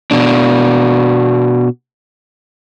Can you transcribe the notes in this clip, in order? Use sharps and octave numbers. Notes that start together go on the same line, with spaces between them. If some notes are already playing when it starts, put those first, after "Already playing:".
B2 D4